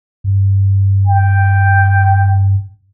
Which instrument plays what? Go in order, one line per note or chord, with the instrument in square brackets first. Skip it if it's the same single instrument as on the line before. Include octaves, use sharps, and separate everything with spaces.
[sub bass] G2
[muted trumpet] G5